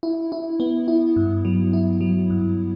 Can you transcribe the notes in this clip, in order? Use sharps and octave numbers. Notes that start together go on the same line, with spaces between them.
E4
E4
B3
E4
G2
F#3
E4
F#3
G2